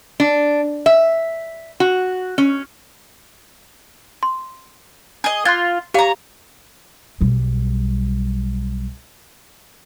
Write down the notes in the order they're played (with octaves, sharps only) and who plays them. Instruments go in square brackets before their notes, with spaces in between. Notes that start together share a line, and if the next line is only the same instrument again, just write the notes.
[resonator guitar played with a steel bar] D4
E5
F#4
C#4
[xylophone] C6
[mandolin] G#4 D#5
[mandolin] F4 [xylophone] C6 F#6 G#6
[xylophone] G4 F5 [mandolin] C#5 A#5
[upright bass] B1 G3